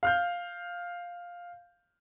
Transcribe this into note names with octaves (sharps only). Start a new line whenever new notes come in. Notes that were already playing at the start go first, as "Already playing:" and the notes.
F5 F6 G6